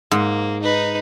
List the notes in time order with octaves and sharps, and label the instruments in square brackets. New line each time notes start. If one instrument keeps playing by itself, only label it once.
[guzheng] G#2 [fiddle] A#3
[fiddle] D#4 B4